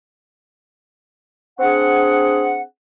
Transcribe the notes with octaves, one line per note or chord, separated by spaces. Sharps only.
C4 D4 G#4 F#5